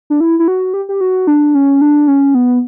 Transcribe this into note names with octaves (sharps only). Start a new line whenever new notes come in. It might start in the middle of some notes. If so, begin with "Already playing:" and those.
D4
E4
E4
F#4
G4
G4
F#4
D4
C#4
D4
C#4
B3